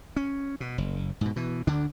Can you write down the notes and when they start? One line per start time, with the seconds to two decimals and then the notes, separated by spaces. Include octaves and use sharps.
0.16 C#4
0.60 B2
0.78 F#1
1.21 G#2 B2
1.36 B2 E3
1.67 D2 D3 D4